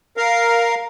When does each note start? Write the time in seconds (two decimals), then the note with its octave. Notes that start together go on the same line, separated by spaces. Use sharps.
0.17 A#4 F5